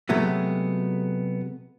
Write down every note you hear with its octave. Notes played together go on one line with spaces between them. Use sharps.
C3 F#3 G#3 A3 B3